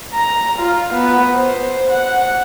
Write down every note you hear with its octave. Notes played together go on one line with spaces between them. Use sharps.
A#5
F4
B3
C5
F#5